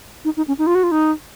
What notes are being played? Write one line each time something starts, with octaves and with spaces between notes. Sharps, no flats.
D#4
D#4
C#4
D#4
F4
F#4
F4
D#4